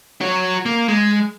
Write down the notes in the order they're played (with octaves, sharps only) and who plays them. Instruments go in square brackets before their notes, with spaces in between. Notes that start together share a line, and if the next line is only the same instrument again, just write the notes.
[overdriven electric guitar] F#4 C#5
A#3
G#3